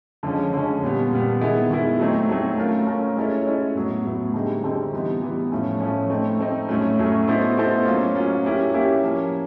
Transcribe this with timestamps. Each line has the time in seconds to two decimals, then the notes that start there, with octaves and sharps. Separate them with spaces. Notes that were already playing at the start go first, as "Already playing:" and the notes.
0.23 D3 F3 G#3 C#4
0.53 D3 F3 G#3 C#4
0.82 A#2 G3 B3
1.11 A#2 G3 B3
1.40 D#3 G#3 B3 E4 G#4
1.70 D#3 G#3 B3 E4 G#4
1.99 F#3 A3 C4 D#4
2.29 F#3 A3 C4 D#4
2.58 A3 C#4 F4 A#4
2.87 A3 C#4 F4 A#4
3.16 G#3 C#4 E4 A4 C#5
3.45 G#3 C#4 E4 A4 C#5
3.75 A2 F#3 B3
4.05 A2 F#3 B3
4.34 D3 G3 C4 D#4 G#4
4.64 D3 G3 C4 D#4 G#4
4.93 E3 G3 B3 D#4
5.22 E3 G3 B3 D#4
5.52 A2 F3 A3 C#4
5.80 A2 F3 A3 C#4
6.10 A3 C4 D#4
6.39 A3 C4 D#4
6.68 A2 F#3 A3 C#4
6.98 A2 F#3 A3 C#4
7.27 B3 E4 A4 C5 D#5
7.57 B3 E4 A4 C5 D#5
7.85 F#3 A#3 C#4 F4
8.15 F#3 A#3 C#4 F4
8.44 A#3 C#4 E4 G4
8.74 A#3 C#4 E4 G4
9.03 F3 A#3 C#4